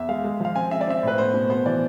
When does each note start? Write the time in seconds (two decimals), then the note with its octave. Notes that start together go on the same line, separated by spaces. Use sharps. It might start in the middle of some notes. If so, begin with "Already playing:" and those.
Already playing: E2 E5
0.09 G#3 F5
0.24 G#3
0.40 F3 F5
0.56 C4 G#5
0.71 C4 E5
0.81 D5
0.87 C4 E5
1.03 A2 B4
1.18 B3 C5
1.34 B2
1.50 B3 C5
1.66 E3 D5